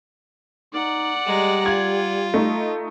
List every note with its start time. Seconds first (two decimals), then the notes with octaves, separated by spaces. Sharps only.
0.73 D#4 D5 F#5
1.26 G3 G#3 A#5
1.66 F4 G#6
2.34 A3 D#4